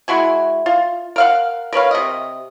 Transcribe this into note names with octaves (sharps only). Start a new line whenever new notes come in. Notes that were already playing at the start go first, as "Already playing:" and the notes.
G#3 E4 F#4 G#5
F4
A#4 F5 F#5
A#4 B4 C#5 F5
C3 D#5